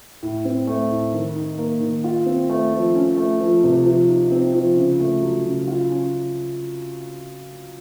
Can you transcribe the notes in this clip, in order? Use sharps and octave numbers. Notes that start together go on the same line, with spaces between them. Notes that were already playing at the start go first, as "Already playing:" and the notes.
A2
C4
A3
A2
D#3
D#4
A#3
D#3
F4
C4
A3
F3
C#4
A3
F3
C3
F3
D#4
C4
F3
C#3
A3
F#3
C#3
F4
C#4